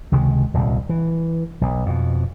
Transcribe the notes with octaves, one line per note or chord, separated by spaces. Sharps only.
C#2 C3 D#3 G#3
D#1 C2
E3
B1
F2 B2